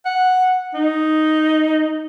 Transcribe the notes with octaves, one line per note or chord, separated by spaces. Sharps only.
F#5
D#4